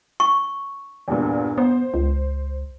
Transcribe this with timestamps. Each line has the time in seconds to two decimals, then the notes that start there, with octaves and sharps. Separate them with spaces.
0.20 C#6
1.08 E2 G2 A#2
1.58 B3 C5
1.94 C#2